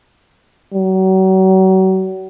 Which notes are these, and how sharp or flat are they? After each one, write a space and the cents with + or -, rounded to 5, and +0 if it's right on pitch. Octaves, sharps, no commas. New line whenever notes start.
F#3 +35